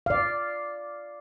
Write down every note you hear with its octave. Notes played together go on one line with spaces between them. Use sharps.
D5 F5